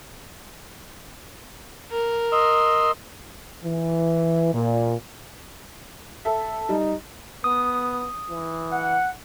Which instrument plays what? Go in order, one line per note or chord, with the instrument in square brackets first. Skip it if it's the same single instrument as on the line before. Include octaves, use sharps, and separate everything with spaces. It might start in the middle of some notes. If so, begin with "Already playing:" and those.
[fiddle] A#4
[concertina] D#5 C6 E6
[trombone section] E3
A#2
[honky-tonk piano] A4 E5 [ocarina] A5
[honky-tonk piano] G3 [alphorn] D#4
[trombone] B3 [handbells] D#6
[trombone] E3
[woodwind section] F#5